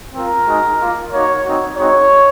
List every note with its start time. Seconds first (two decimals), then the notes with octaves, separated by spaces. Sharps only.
0.14 C4 F4 A#4
0.46 G#3 D#4 F#4
0.79 A#3 F4
1.12 A#3 D#4 F#4 C#5
1.44 C4 D#4 F#4
1.76 G#3 C4 D#4 F#4 C#5